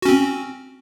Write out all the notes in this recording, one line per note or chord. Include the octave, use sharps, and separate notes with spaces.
C4 C#4 F#4